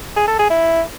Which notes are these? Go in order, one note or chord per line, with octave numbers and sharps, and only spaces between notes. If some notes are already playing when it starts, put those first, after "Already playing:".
G#4
A4
G#4
E4